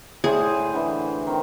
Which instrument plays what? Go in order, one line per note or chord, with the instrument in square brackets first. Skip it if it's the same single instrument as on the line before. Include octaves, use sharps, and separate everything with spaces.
[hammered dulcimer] A2 C5 D5 [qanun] G#4
[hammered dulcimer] D3 E3
D#3 C4